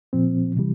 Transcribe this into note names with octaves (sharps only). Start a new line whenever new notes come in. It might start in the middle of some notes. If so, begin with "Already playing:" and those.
A#2 F3 C4
C3 E3 G3